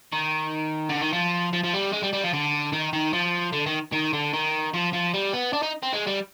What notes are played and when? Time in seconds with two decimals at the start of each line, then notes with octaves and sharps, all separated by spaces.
0.12 D#3
0.89 D3
1.01 D#3
1.13 F3
1.53 F3
1.63 F3
1.73 G3
1.92 G#3
2.03 G3
2.13 G3
2.23 F3
2.33 D3
2.73 D#3
2.93 D#3
3.13 F3
3.53 D3
3.66 D#3
3.92 D#3
4.13 D3
4.33 D#3
4.74 F3
4.93 F3
5.14 G3
5.33 B3
5.53 D4
5.63 D#4
5.83 C4
5.93 G#3
6.07 G3